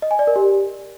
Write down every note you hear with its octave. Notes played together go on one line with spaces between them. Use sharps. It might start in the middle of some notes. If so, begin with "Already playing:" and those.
D#5
G#5
D5
A#4
G4